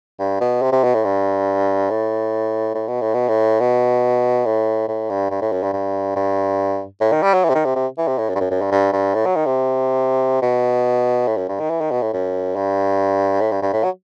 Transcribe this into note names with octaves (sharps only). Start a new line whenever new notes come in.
G2
B2
C3
C3
B2
A2
G2
A2
A2
B2
A2
B2
A2
B2
A2
A2
G2
G2
A2
F#2
G2
G2
G2
A2
D#3
G3
F#3
E3
C3
D#3
C3
C3
E3
C3
A2
F#2
G2
F#2
F#2
G2
G2
G2
A2
F#3
D#3
C3
B2
A2
F#2
G2
D#3
E3
D#3
B2
A2
F#2
G2
A2
G2
G2
A2
F#3